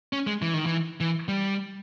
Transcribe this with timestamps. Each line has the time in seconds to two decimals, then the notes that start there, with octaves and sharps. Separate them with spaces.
0.13 C#4
0.27 G#3
0.42 E3
0.54 D#3
0.66 E3
1.00 E3
1.28 G3